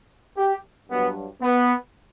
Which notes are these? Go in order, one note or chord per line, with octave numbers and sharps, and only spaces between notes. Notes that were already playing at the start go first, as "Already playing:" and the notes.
G4
G2 F#3 B3
B3